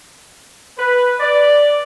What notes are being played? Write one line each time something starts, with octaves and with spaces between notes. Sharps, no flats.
B4
D5